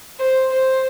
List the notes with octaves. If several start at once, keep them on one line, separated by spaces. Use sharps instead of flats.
C5
C5